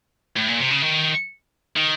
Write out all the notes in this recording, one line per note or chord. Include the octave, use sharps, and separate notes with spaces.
A2
A#2
C3
C#3
D#3
D#3